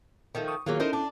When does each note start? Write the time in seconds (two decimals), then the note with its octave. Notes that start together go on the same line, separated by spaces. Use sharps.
0.35 D#3 F3 A3
0.48 C#6 D#6
0.66 D#3 F#3 A#3 F4 G#4
0.80 C#4 D#4 E4 A4 A#4 C5
0.93 D4